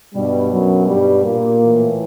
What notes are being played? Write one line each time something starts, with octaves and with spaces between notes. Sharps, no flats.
G2 B2 G3
F#2 F#3
G2 G3
A#2 A#3
A2 E3